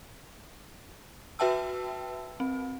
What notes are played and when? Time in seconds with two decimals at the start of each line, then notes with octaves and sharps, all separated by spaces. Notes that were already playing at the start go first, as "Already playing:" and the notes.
1.39 F#4 B4 E5 G5 A5 E6
2.40 C4